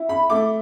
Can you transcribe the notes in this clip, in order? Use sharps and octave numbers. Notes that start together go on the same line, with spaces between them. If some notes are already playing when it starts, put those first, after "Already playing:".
Already playing: E4
B5
A3 D6